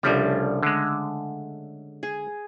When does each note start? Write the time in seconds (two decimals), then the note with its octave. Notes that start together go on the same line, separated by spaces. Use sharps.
0.03 C2 C#3 F3 G3 A3 D4
0.63 D3 G#3
2.03 G#4